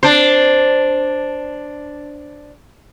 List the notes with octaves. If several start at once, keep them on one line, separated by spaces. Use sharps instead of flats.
D4 C5